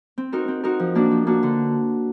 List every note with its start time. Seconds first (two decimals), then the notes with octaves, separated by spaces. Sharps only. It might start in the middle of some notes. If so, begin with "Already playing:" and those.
0.18 C4
0.33 D#4 F#4 A#4
0.48 C4
0.64 D#4 F#4 A#4
0.79 F3
0.95 A#3 D4 F#4
1.11 F3
1.27 A#3 D4 F#4
1.43 D3